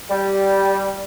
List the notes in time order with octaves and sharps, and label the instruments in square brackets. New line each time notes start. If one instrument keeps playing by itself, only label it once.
[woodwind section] G3